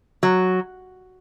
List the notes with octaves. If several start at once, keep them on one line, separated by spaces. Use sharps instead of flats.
F#3